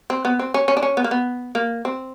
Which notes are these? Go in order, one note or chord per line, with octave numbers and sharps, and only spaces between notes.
C4
B3
C4
C#4
C#4
D4
C#4
B3
A#3
B3
A#3
C4